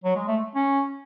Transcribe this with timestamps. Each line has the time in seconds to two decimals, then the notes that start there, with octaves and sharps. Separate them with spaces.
0.04 F#3
0.16 G#3
0.28 A3
0.55 C#4